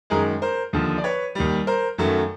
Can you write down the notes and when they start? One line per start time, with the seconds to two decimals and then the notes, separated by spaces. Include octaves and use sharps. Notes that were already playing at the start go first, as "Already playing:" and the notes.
0.10 F#2 D#3 G#3 G#4 A#4
0.42 A#4 C5
0.73 D#2 D3 F3
0.98 D5
1.04 B4 C#5
1.35 D#2 D#3 G3
1.67 A#4 C5
1.98 F#2 D#3 F#3 A3